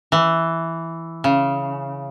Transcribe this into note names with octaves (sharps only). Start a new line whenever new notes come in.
E3
C#3